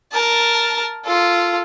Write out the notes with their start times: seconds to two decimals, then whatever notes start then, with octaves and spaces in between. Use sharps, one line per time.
0.12 A#4 A5
1.04 F4 A4